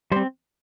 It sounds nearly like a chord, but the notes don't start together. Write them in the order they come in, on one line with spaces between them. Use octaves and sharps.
G3 C5 C4